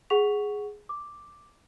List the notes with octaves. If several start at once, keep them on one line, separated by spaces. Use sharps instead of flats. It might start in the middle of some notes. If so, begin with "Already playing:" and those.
G#4 F#5 C#6 B6 F7
D6